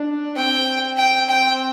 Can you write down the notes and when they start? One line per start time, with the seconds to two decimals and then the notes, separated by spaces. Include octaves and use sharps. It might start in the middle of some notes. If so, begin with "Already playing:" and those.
Already playing: D4
0.36 C4 G5
0.98 G5
1.29 G5